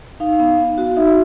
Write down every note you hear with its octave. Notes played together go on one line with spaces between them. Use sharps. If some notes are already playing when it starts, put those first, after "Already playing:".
D#4 F5
B3
B3
F#4
D#4 E5